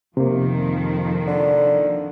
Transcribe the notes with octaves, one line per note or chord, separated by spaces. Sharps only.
F2 C3 D#3 F3 A#3
D3